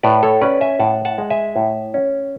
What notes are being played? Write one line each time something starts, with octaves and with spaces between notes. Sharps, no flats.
A2 B4 D5
A4 C#5
C#4 B4 D5
E5 G#5
A2 F#5 A5
F#5 A5
G#3
E5 G#5
A2
C#4